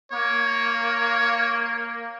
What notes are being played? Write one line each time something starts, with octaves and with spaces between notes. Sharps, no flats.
A#3 C#5